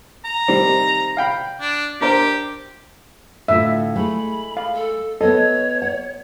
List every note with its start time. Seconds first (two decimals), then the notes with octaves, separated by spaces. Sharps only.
0.25 A#5
0.48 D#3 G3 C4
1.17 F5 G5 B5
1.61 D4
2.01 D4 G4 A#4 C5
3.48 A2 D3 F4 E5
3.96 G#3 A3 B5
4.57 F5
4.73 A4
5.21 B3 A4 C#5 D#5
5.82 F#5